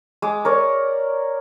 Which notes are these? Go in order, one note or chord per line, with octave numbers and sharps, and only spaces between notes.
G#3 D6
A#4 C#5 D5